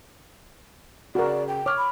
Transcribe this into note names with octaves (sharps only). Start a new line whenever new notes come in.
C#3 F#4 A#4 D5
G5
C#5 D6 F6
B5